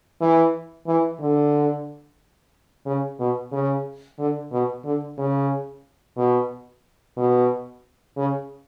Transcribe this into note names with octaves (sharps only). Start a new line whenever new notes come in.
E3
E3
D3
C#3
B2
C#3
D3
B2
D3
C#3
B2
B2
C#3